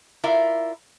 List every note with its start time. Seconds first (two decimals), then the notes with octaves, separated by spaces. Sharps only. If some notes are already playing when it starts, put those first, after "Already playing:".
0.24 E4 F4 A#4 D5 E5